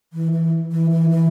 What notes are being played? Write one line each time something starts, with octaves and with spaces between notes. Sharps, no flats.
E3
E3
E3
E3
E3